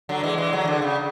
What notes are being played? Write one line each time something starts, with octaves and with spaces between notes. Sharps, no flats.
D3 F#3
E3 G#3
E3 G#3
D3 F#3
D3
C#3